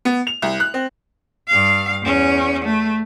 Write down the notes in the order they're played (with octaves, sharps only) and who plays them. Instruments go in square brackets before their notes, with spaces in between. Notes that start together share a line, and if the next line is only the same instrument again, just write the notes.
[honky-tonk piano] B3
F7
C2
F#6
C4
[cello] G2 F5
E2 C#4
A3